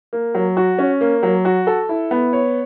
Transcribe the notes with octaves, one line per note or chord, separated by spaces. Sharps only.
A#3
F#3
F#4
C#4
A#3
F#3
F#4
A4
E4
B3
C#5